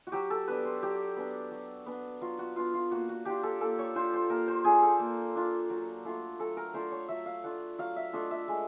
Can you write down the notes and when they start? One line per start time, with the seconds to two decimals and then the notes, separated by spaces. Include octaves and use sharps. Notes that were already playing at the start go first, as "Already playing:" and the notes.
0.07 F#4
0.12 F#3 G4
0.30 A4
0.47 B3 D4 B4
0.65 C5
0.82 F#3 G4
1.16 B3 D4
1.51 F#3
1.86 B3 D4
2.21 F#3 F4
2.39 F#4
2.56 B3 D4 F4
2.74 F4
2.91 A#3 F#4
3.09 F#4
3.25 D4 F4 G4
3.43 A4
3.61 A#3 A4
3.79 C#5
3.95 D4 F4 C5
4.14 C5
4.30 A#3 A#4
4.48 C5
4.65 D4 F4 G#4
4.82 A4
4.99 A#3
5.35 D4 F4
5.70 F#3
6.05 A3 D4 F4
6.39 F#3 A4
6.57 A#4
6.73 A3 D4 F4 C5
6.92 C#5
7.08 F#3 E5
7.26 F5
7.44 A3 D4 F4 F#5
7.79 F#3 F5
7.96 E5
8.13 A3 D4 F4 D#5
8.31 E5
8.48 G#3